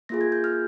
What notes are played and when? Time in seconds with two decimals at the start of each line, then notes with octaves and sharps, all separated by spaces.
0.09 A#3 F4 G#4 A#6
0.21 G#6
0.32 G6
0.44 F6